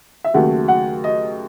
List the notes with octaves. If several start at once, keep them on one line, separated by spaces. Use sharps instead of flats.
E5
D#2 C#3 F#3 A3 F#5
F#5
D#5